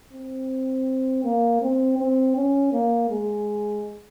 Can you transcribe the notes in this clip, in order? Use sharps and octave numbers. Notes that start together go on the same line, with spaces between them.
C4
A#3
C4
C4
C#4
A#3
G#3